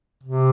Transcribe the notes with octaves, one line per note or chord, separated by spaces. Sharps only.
C3